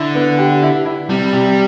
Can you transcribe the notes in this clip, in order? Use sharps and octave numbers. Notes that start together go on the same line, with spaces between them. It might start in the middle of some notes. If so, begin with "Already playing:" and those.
Already playing: D3 E4
B3
G4
E4
E4
C3 G3
C3